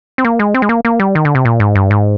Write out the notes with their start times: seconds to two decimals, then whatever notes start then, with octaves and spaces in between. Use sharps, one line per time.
0.18 C4
0.25 A#3
0.39 G#3
0.54 C4
0.62 G#3
0.69 A#3
0.85 A#3
1.00 G3
1.15 D#3
1.25 D3
1.35 C3
1.45 A#2
1.60 G#2
1.75 G2
1.91 G#2